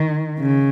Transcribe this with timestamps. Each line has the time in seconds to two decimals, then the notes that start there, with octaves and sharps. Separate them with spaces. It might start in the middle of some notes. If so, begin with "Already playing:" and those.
Already playing: D#3
0.40 C#3